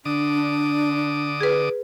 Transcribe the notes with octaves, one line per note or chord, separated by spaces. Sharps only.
D3 D4 D6 D#6
G#4 B4